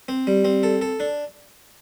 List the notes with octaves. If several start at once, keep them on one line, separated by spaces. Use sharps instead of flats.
C4
G3
C4
A4
A4
D4